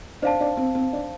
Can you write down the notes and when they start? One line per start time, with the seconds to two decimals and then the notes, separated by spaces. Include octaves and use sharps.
0.22 D4 C5 F5 A5
0.40 D4
0.57 C4
0.75 C4
0.93 D4